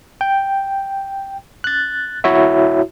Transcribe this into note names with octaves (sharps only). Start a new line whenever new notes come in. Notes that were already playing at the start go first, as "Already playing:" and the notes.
G5
F#6 A6
E4 F#4 C#5 E5